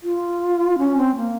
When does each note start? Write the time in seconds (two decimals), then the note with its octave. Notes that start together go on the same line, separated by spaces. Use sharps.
0.03 F4
0.79 C#4
0.97 C4
1.16 A#3